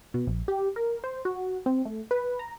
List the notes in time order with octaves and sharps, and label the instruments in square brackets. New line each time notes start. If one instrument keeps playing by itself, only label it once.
[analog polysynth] B2
A#1
G4
A#4
C5
F#4
C4
A3
B4
A#5